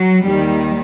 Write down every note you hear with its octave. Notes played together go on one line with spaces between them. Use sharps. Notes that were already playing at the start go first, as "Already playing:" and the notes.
Already playing: F#3
D#2 D#3 G3